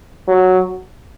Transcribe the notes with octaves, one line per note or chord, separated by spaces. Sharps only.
F#3